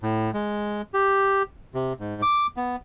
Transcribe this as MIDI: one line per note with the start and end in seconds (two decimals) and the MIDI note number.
0.03 0.31 45
0.34 0.82 56
0.94 1.43 67
1.74 1.93 48
2.00 2.22 44
2.22 2.47 86
2.57 2.76 59